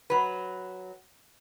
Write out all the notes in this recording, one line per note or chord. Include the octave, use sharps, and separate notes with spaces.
F#3 B4